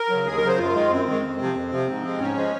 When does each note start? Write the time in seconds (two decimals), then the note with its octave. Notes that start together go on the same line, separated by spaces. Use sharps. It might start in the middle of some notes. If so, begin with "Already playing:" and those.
Already playing: A#4
0.10 C#3 F#3
0.26 D#2 G#4
0.37 A#4
0.43 C#3 F#3 C5
0.58 F#2 F4
0.74 D#3 G#3
0.90 F#2 C4
1.06 D#3 G#3
1.22 F2
1.38 C3
1.43 F3
1.55 F2
1.72 C3 F3
1.88 G#2
2.03 F3 G#3
2.19 G#2 C#4
2.36 F3 G#3